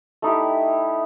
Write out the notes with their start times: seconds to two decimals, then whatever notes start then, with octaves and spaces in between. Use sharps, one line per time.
0.22 A3 D#4 E4 G4